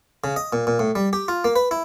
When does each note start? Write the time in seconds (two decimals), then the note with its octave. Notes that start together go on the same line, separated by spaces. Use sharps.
0.24 C#3
0.36 D#5
0.53 A#2
0.67 A#2
0.79 A2
0.95 G3
1.13 G4
1.28 F4
1.44 A#3
1.56 B4
1.71 E4